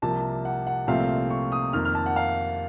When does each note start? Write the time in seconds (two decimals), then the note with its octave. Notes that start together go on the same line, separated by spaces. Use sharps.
0.02 C2 C3 F3 A#3 A5
0.45 F#5
0.67 F#5
0.87 C2 A#2 F3 A3 C4 F5
1.30 C#6
1.52 D#6
1.73 F2 D#3 A#3 F6
1.85 F6
1.95 A5
2.06 F#5
2.16 F5